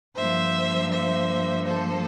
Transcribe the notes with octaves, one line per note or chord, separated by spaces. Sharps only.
G2 F3 A#3 C5 E5
C5 E5
A4 C5